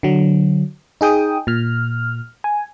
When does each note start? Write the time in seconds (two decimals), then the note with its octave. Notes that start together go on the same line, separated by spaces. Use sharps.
0.03 D3 F#3
1.01 D#4 G#4 G5 D#6
1.47 A#2 F6
2.44 G#5